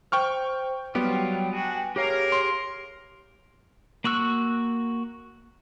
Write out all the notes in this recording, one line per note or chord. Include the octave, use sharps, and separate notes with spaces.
C5 G5 C#6 F6
F#3 G3 B3 F4 G4 G5
D4 F#4 G#5
G4 G#4 A#4 C#5 F5
C6
A#3 F#4 C#6 E6 F#6